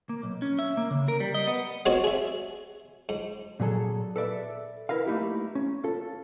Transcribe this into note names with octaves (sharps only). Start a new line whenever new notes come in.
A#3
B1
C#4
E5
A#3
C#3
A#4
G3
D#5
B3
G#3 B3 C4 F#4 C#5 D5
G#4 E5
G#2
A#2 F#3 G#4 A4
A4 B4 D5 E5
E4 A#4 B4 F5
A3 A#3 D#4 E4 G4
C#4
F4 A4